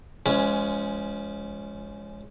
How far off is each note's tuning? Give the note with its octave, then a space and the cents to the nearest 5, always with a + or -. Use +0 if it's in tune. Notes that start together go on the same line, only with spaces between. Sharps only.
F3 -30 G#3 +0 C#4 +10